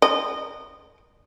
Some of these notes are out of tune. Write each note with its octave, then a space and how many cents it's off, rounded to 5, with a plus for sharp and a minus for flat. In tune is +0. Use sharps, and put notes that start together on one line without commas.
D#5 -20